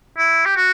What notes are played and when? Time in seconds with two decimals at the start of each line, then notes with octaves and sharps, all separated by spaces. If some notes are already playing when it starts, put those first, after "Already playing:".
0.18 E4
0.46 G4
0.56 F#4